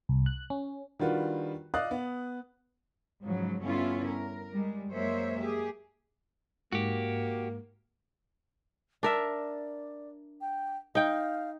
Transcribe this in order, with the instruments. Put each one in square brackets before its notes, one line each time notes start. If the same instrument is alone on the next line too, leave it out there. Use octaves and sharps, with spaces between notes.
[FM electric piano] C2
F#6
C#4
[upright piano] D#3 G3 D4 F4 F#4 B4
D5 D#5 F5 D#6 F#6
B3
[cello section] G#2 C#3 F3 F#3
G2 D3 B3 C#4 E4 F4
A#4
G3 G#3
F#2 G#3 A#3 C5 C#5 E5
G4 G#4
[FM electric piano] G#2 [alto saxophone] A#3 [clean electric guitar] F#4 G4
[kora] D4 A#4 E5 [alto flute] D5
[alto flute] G5
[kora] D#4 G5 [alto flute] F5